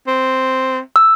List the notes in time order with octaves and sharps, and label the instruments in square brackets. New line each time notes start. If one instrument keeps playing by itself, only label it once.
[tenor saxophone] C4
[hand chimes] E6